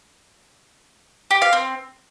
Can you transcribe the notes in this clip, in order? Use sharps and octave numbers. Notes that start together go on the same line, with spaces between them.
G4
F5
C4